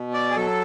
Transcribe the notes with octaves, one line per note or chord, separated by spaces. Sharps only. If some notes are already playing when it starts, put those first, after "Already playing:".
Already playing: B2
D5
G#4
F#3 A4